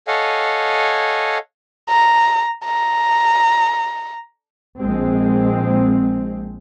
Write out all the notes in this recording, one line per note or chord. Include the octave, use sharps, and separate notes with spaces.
A4 C#5 D#5 F5 F#5 G#5
A#5
A#5
A#1 G#3 C4